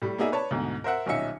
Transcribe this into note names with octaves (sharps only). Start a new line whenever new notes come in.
A2 G3
A#3 B3 D#4 G#4 D5 E5
B4 C#5 D5 A5
D2 G#2 B2
A#4 C5 E5 F#5
D#1 B1 C#4 D#4 E5 C#7